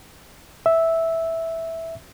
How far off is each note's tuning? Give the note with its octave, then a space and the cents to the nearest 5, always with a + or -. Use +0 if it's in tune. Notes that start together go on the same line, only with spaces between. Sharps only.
E5 -5